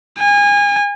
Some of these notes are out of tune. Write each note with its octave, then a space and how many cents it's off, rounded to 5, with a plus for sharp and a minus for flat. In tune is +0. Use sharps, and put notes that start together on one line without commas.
G#5 -30